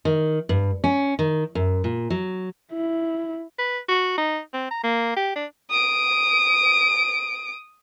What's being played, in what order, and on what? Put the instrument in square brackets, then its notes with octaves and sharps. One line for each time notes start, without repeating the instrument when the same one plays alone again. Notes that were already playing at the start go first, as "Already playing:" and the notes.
[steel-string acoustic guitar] D#3
G2
C#4
D#3
F#2
A#2
F#3
[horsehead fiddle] E4
[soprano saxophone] B4
F#4
D#4
C4
A#5
A#3
G4
D4
[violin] D#6 D7